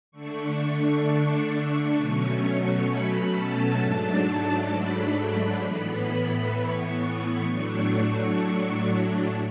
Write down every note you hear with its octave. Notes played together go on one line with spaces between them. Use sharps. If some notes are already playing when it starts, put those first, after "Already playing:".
D3 A3 D4 C#6
B2 F#3 A3 C#4
B5
A5
G#2 F#3 A3 D4
B5
A2 E3 B3
C#6
A2 F#3 A3 D4
C#6